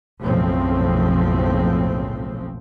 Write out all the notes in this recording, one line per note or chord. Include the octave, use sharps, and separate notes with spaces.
F#1 B1 A2 C#3 F3 C4